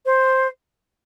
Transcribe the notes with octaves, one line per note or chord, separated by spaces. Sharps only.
C5